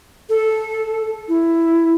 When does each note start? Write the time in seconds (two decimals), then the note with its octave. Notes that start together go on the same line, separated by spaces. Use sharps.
0.29 A4
1.28 E4